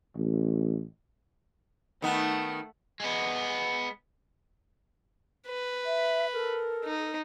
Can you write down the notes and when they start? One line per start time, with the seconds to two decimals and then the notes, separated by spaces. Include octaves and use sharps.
0.16 A1
2.02 D#3 A3 B3 F#5
3.00 G#3 B3
5.47 B4
5.85 E5
6.34 A4 A#4
6.85 D#4